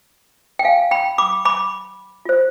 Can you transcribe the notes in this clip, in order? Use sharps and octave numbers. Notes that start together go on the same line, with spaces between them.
G5
F5 G#5
G5 B5
B5 D6
B5 D6
F4 C5